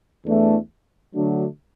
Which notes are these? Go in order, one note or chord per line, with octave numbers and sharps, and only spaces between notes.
E2 E3 A3 D4
D3 F#3 A3 D4 F#4